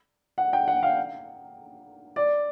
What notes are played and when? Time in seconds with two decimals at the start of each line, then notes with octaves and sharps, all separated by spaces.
0.38 F#5
0.53 G5
0.68 F#5
0.83 F5
2.16 D5